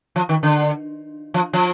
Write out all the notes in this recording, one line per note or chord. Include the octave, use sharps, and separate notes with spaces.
F3
D#3
D3
F3
F3